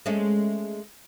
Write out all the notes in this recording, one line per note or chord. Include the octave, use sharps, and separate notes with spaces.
G#3 A3 C#4